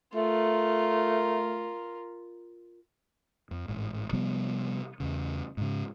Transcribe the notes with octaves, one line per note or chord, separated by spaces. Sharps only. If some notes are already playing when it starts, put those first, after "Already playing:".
A3 F4 A#4
F2
A1 G#2
C3 F3 G3 B3
E2 C#3
G#2 C#3